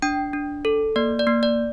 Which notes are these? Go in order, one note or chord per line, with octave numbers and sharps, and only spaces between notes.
D4 G5
D4
A4
A#3 D5
D5
A#3
D5